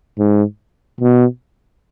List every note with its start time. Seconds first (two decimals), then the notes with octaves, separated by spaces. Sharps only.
0.18 G#2
1.00 B2